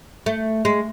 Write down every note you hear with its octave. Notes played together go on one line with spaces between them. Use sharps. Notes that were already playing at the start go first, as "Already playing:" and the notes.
A3
G#3